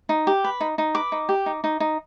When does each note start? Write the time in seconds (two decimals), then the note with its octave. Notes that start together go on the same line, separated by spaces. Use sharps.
0.09 D#4
0.27 G4
0.44 B4
0.61 D#4
0.78 D#4
0.95 B4 D6
1.12 D#4
1.29 G4
1.46 D#4
1.64 D#4
1.80 D#4